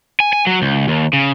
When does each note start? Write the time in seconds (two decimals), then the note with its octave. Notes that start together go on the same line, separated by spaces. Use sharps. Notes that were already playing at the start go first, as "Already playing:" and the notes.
0.20 G#5
0.33 G#5
0.47 F#3
0.62 C#2
0.88 D#2
1.13 C#3